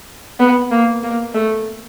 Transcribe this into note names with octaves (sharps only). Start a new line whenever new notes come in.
B3
A#3
A#3
A3